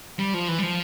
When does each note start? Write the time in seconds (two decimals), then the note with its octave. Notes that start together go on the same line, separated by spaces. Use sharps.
0.19 G3
0.34 F3
0.48 E3
0.58 G3
0.63 F3